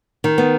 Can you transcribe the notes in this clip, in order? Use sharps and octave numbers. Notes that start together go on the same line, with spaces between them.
D#3
B3